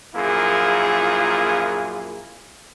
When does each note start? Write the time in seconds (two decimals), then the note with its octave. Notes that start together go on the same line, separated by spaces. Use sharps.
0.15 A#1 F#2 A#3 E4 F4 G#4